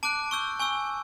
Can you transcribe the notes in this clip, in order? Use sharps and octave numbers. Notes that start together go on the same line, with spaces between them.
A5 D6 F#6 D7
C#6 E6 G6
G#5 C#6 E6